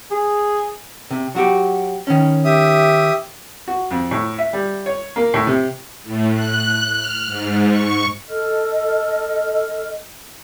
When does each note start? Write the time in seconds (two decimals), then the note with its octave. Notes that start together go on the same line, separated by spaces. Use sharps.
0.11 G#4
1.11 C3
1.35 F#3 F#4 G4
2.07 D#3 C#4
2.45 G4 E5 D#6
3.68 F#4
3.91 F2
4.11 A2
4.38 E5
4.53 G3
4.86 C#5
5.16 A#3
5.34 A2
5.47 C3
6.03 A2
6.33 F#6
6.94 F6
7.26 G#2
7.69 C#6
8.29 A4 D#5 F6